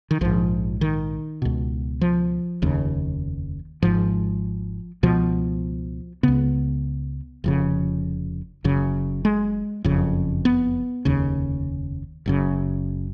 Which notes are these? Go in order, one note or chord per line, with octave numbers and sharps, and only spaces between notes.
D#3
A#1 G#2 F3
D#3
C#2 B2
F3
F1 D#2 C#3
G#1 G#2 F3
C#2 B2 F3
C#2 C#3 B3
F1 F2 C#3
F#1 F#2 C#3
G#3
F#1 F2 C#3
B3
F1 D#2 C#3
F#1 F#2 C#3